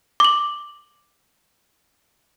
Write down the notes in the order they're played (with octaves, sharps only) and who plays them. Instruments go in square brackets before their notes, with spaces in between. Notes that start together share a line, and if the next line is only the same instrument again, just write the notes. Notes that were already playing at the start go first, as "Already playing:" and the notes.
[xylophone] D6 F#7